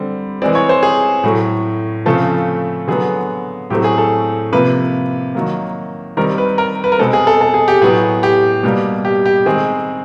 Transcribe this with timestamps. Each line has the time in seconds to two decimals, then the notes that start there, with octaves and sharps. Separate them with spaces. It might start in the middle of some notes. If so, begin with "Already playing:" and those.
Already playing: D3 G3 C4
0.42 E3 G#3 C4 D5
0.55 C#5
0.69 C5
0.83 G#4
1.24 A2 F#3 A3
2.06 C#3 F3 A3 C4 A4
2.88 D3 F#3 B3 G#4
3.70 A2 F#3 A3 C4 G4
3.84 G#4
3.98 A4
4.53 C3 F3 A#3 B4
5.35 D#3 F#3 A#3
6.17 D#3 G3 C4 A#4
6.38 B4
6.58 A#4
6.84 B4
6.92 A#4
6.99 B2 G#3 C4 A4
7.13 G#4
7.27 A4
7.41 A4
7.54 G#4
7.68 G4
7.81 A2 F#3 B3 G#4
8.23 G4
8.64 B2 G3 A#3
9.05 G4
9.26 G4
9.46 D#3 G#3 C4 G#4